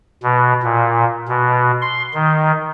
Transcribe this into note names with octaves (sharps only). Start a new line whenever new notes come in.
B2
A#2
B2
C6
D#3